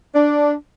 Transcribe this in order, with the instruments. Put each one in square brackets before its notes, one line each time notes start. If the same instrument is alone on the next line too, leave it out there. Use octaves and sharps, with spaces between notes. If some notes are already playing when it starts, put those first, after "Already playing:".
[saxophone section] D4